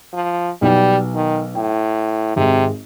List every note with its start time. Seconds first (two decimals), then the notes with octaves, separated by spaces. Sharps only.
0.13 F3
0.62 B1 G3 B3
1.14 D#3
1.55 A2 G5
2.36 G#1 C3 G#3